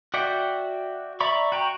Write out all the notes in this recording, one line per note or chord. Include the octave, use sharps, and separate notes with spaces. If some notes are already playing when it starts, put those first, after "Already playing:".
F#4 D5 E5 F#5 G5
D5 E5 A#5 B5 C#6
F#4 G5 A#5